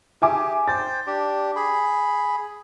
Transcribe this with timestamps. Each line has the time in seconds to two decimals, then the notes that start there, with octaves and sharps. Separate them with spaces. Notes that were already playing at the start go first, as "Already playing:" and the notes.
0.22 G4 G#4 E5 G#5 D6
0.68 C5 G5 A6
1.07 D4 G4
1.56 G#4 B5